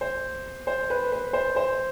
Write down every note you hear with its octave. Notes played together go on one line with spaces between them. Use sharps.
C5
C5
B4
B4
C5
C5